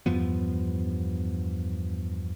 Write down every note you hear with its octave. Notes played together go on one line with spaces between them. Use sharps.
E2 G2 F3 B3